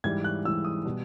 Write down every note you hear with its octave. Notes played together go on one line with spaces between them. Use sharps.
G#2 E3 G3 G#6
F#6
G#2 E3 G3 E6
D#6
B2 G3